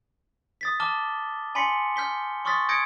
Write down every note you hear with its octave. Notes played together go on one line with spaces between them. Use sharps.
D#6 A6 B6
A5 D6 F6 G7
G#5 B5 C6 B6 C#7
F6 G6 B6 G7
C6 C#6 D#6 F6 A6 B6
D#6 G6 G#6 A#6 C#7 D7